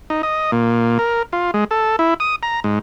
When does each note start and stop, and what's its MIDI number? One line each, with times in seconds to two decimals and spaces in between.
0.10 0.22 63
0.23 0.51 75
0.52 0.98 46
0.99 1.23 70
1.33 1.51 65
1.54 1.64 56
1.71 1.96 69
1.99 2.14 64
2.20 2.36 87
2.43 2.60 82
2.64 2.79 44